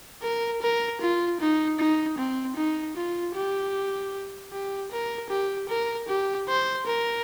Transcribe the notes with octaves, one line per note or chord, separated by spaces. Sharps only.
A#4
A#4
F4
D#4
D#4
C4
D#4
F4
G4
G4
A#4
G4
A#4
G4
C5
A#4